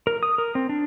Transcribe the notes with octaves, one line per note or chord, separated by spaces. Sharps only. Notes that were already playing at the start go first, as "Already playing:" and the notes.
A#4
D#6
A#4
C4
D4